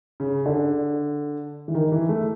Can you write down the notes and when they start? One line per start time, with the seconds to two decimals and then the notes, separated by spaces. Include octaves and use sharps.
0.20 C#3
0.46 D3
1.68 E3
1.74 D#3
1.92 E3
2.09 A3